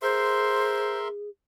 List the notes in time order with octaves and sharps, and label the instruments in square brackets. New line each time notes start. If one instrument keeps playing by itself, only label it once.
[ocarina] G#4 [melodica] A#4 E5 C6 [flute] C5